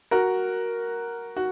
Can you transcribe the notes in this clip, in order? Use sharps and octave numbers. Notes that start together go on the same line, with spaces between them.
F#4 A#4
F#4